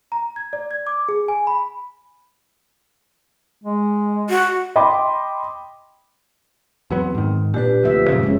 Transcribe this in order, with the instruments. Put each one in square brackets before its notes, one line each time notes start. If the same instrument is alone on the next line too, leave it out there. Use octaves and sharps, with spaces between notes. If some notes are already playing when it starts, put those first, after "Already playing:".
[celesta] A#5
G#6
D5
G#6
D6
G#4
G#5
B5
[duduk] G#3
[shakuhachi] F#4
[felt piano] D#5 G5 B5 C6 D6
[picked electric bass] E2 F#3 B3 [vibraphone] C4
[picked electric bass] G#2 D#3
[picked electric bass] A#2 D4 [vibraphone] G4 B4
[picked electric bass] D2 [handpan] C3 F3 E5
[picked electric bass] F#2 A#2 C#3
[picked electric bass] F#1 [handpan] G#3 C#4